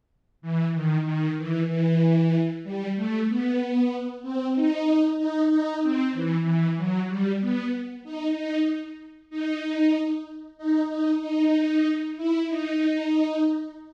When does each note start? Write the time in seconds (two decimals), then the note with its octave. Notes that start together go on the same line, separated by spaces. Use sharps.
0.42 E3
0.74 D#3
1.05 D#3
1.37 E3
1.69 E3
2.64 G3
2.96 A3
3.28 B3
4.22 C4
4.55 D#4
5.19 D#4
5.50 D#4
5.82 C4
6.13 E3
6.44 E3
6.77 F#3
7.08 G3
7.41 B3
8.04 D#4
8.36 D#4
9.30 D#4
10.58 D#4
10.89 D#4
11.21 D#4
12.17 E4
12.48 D#4